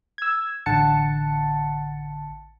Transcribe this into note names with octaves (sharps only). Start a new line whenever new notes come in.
E6 G#6
A1 D3 F#5 A5 A6 C#7